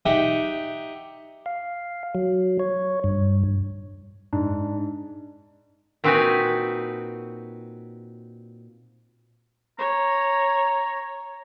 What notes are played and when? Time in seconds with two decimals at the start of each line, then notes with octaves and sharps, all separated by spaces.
0.06 D#4 G4 E5 F#5
1.46 F5
2.15 F#3
2.59 C#5
3.04 G2
4.33 G#2 D4
6.04 A#2 C4 D#4 F#4 B4 G#5
9.79 C#5 A#5